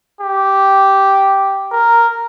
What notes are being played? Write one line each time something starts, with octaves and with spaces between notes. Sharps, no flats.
G4
A#4